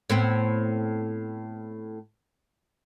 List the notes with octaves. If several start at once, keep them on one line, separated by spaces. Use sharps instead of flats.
A2 B3 C4